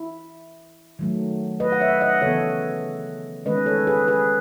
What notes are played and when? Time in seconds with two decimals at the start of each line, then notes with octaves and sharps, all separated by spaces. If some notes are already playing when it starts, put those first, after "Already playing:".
Already playing: E4
0.99 D#3 F#3 A3
1.60 B4 D#5
1.72 F#5
1.80 C#5 E5
2.01 D#5 F#5
2.22 C#3 E3 B3 A4 C#5
3.46 D#3 G#3 C#4 B4 D#5
3.66 A4 C#5
3.87 G#4 B4
4.08 G#4 B4